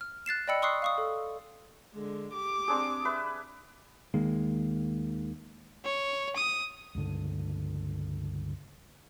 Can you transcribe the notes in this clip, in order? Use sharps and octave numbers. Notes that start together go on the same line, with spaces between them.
F6
F#6 A6 C7 E7
D5 D#5 G5 B5 E6 C#7
C6 C#6 D#6 E6 F#6 C7
F5 C#6 D#6
A4
D3 G#3
G4 D6
C4 D4 G#4
B4 E5
D#2 D#3 G#3 A#3
C#5
D#6
C#2 G2 D3